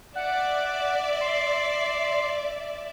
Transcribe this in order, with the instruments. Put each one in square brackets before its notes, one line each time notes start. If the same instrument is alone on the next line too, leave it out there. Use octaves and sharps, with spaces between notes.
[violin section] D5 E5 [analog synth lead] F#5
[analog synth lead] C6